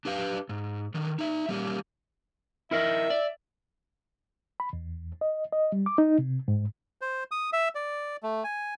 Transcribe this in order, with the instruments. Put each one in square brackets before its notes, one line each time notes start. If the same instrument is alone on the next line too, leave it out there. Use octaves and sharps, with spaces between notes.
[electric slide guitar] D4 G4 B4 F5
G#2
D3 D#3
D#4 E5
G3 A#3 C#4
[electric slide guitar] E4 A#4 D#5 [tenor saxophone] E5
[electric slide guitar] D5
[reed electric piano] B5
E2
D#5
D#5
G3
D6
D#4
C3
G#2
[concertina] C5
D#6
E5
D5
A3
G#5